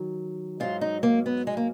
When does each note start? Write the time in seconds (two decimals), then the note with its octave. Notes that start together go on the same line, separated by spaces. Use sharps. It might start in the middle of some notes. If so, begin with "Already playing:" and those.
Already playing: D#3 F#3
0.60 G#2 F#3 F4
0.81 D#4
1.03 A#3
1.26 B3
1.47 G#3
1.57 A#3